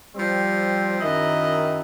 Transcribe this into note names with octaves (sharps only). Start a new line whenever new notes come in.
F3 G3 C4
F#2 D#3 E4 D#5